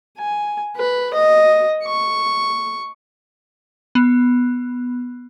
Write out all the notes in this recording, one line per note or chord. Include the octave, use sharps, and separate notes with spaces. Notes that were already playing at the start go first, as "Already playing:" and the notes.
G#5
B4
D#5
C#6
B3